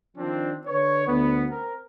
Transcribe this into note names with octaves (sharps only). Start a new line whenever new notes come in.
D#3 F3 C4 D4
D3 B4 C#5
D2 B3
C4 A#4